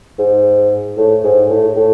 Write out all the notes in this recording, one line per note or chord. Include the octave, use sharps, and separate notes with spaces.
G#2
A2
G#2
A2
A2